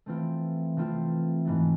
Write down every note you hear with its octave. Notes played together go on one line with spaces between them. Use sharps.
E3 A3 C4 F4
E3 A3 C4 F4
G#2 E3 A3